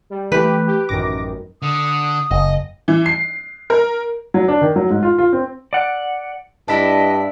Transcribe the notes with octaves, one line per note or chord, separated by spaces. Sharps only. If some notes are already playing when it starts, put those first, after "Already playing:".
G3
E3 A3 G4 B4
G4
A1 F#2 D#3 D6 A#6
D3 D#6
F#1 D#5
E3
C7
A#4
F#3
D4
D#3
F#3
G#2
F4
F4
C4
D5 F#5
G2 D4 E4 D#5 E5 A5 B6